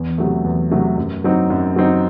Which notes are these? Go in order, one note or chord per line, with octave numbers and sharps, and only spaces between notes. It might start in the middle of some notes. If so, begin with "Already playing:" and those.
Already playing: E2
C3 F#3 A3
E2
C3 F#3 A3
F#2
F#3 C4 D#4
F#2
F#3 C4 D#4